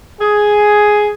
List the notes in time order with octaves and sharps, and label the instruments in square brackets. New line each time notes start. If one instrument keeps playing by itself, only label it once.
[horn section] G#4